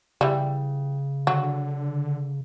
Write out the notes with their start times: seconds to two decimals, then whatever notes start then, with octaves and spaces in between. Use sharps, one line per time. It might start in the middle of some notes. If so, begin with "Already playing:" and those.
0.21 C#3 E3 G3
1.27 D3 F#3